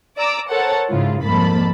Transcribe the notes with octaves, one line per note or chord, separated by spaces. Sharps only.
D5 A#5 D6 E6
A4 A#4 C5 C#5 F#5 A5
G#2 C#3 G#3 E4 F4
C2 F2 G#2 A#3 A5 B5